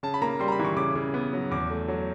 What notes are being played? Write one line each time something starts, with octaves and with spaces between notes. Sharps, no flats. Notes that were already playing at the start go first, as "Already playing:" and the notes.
C#3 A5
B5
A#3 A#5
G3 C6
A#5
B5
E3
C#6
C#3 D6
C#3
B3
F#3
E2 D6
A3
F#3